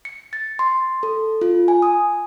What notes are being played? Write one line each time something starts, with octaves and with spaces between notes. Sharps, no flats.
C#7
A6
C6
A4
F4
G#5
D#6